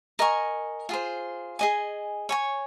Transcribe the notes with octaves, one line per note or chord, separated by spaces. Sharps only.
A#4 D#5 G#5 C#6
F4 G#4 C5
G#4 D#5 G#5
C#5 G#5 C#6